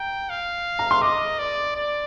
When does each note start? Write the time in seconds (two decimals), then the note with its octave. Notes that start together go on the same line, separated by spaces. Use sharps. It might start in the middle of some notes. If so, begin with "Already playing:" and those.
Already playing: G5 A#5
0.30 F5
0.79 A#5
0.91 C6
1.02 D#5 D6
1.39 D5
1.75 D5